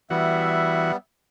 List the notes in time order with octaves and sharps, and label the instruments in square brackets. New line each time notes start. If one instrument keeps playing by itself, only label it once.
[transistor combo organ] E3 F#4 [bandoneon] G3 B3 [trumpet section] E5